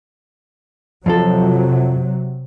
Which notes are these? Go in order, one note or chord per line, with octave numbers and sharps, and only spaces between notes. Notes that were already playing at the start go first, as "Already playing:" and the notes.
F2 C3 F3 F#3 A4